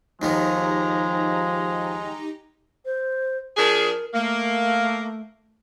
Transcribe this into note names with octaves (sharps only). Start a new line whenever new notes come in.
D#2 D#3 F3 G#3 B3 D#4 G4 A#5
C5
F3 D4 G#4 A#4
A3 A#3